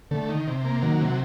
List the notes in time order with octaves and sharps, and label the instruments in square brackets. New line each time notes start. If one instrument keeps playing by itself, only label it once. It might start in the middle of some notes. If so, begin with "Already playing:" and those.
[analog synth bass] D3 [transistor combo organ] A3
[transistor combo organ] D#3
C3
A#3
[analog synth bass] D#3 [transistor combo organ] F#3
[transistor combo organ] C3